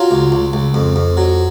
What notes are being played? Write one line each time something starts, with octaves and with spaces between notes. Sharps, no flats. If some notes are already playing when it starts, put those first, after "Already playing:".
Already playing: F#3 F4
C#2
C#2
C#2
F2
F2
F#3